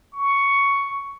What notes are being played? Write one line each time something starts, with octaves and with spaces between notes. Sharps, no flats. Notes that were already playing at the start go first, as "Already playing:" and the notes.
C#6